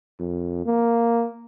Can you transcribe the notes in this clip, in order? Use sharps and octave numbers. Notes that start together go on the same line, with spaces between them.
F2
A#3